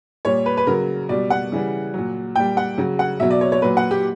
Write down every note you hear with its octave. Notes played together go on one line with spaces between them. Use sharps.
A#2 G3 C#5
B4
B4
C#3 F#3 A#4
B2 G3 D5
F#5
C#3 E3 G3
A#2 F#3
A#2 G3 G5
F#5
C#3 F#3
F#5
B2 F#3 E5
D5
C#5
C#5
A#2 F#3 B4
F#5
G4